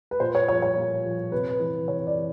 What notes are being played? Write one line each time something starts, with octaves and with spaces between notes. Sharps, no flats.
B4
A#2 C5
C#5
F3 C#5
C#5
A#2
F3
C3 B4
E3 B4
C3 C#5
D5
E3